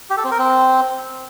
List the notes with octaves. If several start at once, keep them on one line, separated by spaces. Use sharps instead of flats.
G4
A4
C4
A#4
C4